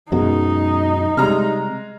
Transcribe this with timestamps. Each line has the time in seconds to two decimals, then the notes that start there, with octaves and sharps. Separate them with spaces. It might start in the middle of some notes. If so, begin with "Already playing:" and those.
0.12 F#2 B2 G#3 D#4
1.17 C3 G3 G#3 A#5 F6